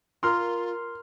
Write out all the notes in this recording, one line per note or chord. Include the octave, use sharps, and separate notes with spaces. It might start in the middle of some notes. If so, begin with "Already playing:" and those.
F4 A#4 C6 F6